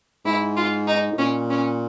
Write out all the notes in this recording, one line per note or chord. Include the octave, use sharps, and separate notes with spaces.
G#2 E4
F4
D#4
A2
A#2 C#4
C#4